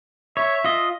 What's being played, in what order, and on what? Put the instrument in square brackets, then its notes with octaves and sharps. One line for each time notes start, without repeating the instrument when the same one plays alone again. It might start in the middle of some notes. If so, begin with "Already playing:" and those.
[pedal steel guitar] C#5 [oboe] E5
[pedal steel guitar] F4 D#5